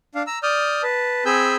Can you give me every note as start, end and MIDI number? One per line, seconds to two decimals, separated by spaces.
0.15 0.23 62
0.15 0.23 77
0.27 0.39 82
0.27 0.39 88
0.43 0.82 74
0.43 0.82 87
0.43 0.82 89
0.43 0.82 91
0.83 1.24 71
0.83 1.24 81
1.26 1.56 60
1.26 1.56 68
1.26 1.56 80
1.26 1.56 83
1.26 1.56 88
1.26 1.56 91